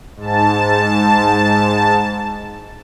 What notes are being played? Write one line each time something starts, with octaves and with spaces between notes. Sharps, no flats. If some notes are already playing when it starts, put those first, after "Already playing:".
G#2 A5